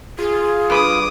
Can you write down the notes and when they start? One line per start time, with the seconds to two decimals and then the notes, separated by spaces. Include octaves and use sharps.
0.19 F4 G#4
0.70 G2 B4 D6 D#6